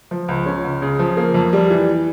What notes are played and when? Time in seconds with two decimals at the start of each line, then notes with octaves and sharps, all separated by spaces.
0.11 F3
0.28 C#2
0.46 C#4
0.64 C#2
0.82 C#3
0.99 F3
1.17 A#3
1.34 F2
1.53 G3
1.70 E3